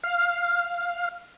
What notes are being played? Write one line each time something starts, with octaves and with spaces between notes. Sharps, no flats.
F5